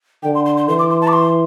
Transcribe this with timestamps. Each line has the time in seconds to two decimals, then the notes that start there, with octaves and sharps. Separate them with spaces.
0.23 D3 G5
0.35 C6
0.46 C6
0.57 C6
0.68 E3 C6
0.79 D6
0.90 C6
1.01 A5
1.08 D6
1.13 C6